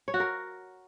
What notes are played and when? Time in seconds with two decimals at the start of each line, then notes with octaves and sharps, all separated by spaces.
0.08 C#5
0.14 F#4
0.20 A#4